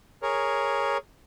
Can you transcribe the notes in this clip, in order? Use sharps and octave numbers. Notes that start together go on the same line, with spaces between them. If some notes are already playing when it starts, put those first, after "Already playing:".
G#4 A#4 C#5